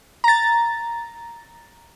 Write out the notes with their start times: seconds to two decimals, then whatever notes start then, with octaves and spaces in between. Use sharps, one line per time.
0.24 A#5 A6